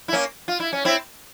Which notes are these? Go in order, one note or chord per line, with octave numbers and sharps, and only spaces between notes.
E4
A#3 C#4
F4
E4
C#4
C4 E4